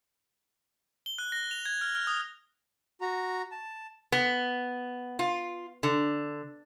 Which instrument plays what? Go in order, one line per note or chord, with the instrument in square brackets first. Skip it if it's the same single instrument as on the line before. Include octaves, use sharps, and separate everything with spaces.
[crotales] G7
F#6
A#6
F7
G#6
F6
F6
D#6
[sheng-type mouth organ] F#4 A#5
A5
[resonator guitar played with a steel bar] B3
F4
D3